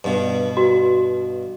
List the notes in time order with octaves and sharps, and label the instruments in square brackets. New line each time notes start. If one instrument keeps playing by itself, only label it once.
[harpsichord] G2 B2
[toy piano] F#4